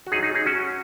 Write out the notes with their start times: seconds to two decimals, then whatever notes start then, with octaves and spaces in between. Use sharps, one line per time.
0.07 F#4
0.12 F#2 D#4 G#4
0.15 F#3
0.23 D#4 G#4
0.35 D#4 G#4
0.46 C#4 F#4